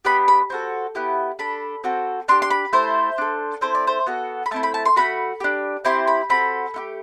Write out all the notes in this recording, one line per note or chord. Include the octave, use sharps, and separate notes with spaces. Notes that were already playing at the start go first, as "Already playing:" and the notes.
B3 D4 G4 B5
B5
C4 F#4 A4
B3 E4 G4
D4 A4 B5
C4 F#4 A4
D4 G4 C6
C6
B5
A3 E4 A4 C5
D4 A4
C4 E4 A4 C5
D5
C5
B3 F#4 A4
B5
A3 C4 E4 A5
B5
A5
C6
A3 D4 F#4 B5
D4 G4
C4 E4 G4 C6
B5
C4 F#4 A4 B5
A3 E4 G4